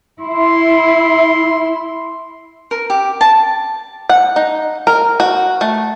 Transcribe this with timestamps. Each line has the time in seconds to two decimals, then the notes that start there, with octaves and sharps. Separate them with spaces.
0.21 E4 C6
2.71 A#4
2.90 G4
3.21 A5
4.09 F#5
4.36 D#4
4.87 A#4
5.20 F#4
5.61 A3